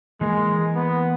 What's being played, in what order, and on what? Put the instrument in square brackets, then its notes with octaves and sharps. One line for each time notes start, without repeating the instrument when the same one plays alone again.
[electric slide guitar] E3 A#3 A#4 [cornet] G#3
[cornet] B3